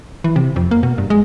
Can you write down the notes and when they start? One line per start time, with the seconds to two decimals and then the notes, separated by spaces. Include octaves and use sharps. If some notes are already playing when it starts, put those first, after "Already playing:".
0.24 E3
0.36 C3
0.56 F2
0.71 A#3
0.83 B2
0.98 G2
1.10 G#3